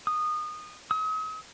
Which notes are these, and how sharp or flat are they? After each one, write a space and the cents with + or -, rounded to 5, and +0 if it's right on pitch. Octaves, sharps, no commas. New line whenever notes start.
D#6 -20
D#6 +40